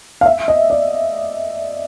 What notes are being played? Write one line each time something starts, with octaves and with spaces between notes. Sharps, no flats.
F5
E5
D#5
D5